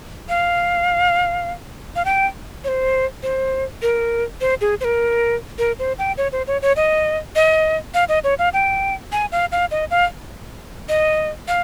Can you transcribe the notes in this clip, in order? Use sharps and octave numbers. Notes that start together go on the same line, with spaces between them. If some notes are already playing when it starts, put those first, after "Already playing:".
F5
F5
G5
C#5
C5
C5
A#4
C5
G#4
C5
A#4
A#4
C5
G5
C#5
C5
C#5
C#5
D#5
D#5
F5
D#5
C#5
F5
G5
G#5
F5
F5
D#5
F5
D#5
F5